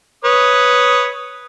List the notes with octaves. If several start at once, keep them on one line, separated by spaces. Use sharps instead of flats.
B4 C#5 D#6